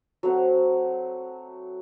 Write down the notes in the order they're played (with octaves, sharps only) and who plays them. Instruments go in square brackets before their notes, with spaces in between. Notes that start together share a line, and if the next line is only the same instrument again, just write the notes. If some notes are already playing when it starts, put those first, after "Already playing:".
[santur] F#3 A3 C4 F#5